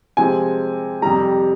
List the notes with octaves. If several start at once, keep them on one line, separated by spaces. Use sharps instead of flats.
C3 F3 G#3 G#5
F2 C3 G3 A#5